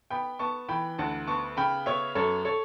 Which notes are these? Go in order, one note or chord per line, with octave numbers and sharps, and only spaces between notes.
B3 G5 B5
B3 A5 C#6
E3 G5 B5
D2 F#5 A5
B3 A5 C#6
C#3 G5 B5
B3 C#5 E5
F#2 A4 C#5
A4 C#5